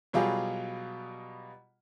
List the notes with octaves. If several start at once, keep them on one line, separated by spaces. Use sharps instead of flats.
B2 F#3 G3 F4 G4 G#4